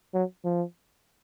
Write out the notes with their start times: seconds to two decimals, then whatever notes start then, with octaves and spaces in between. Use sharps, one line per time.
0.14 F#3
0.44 F3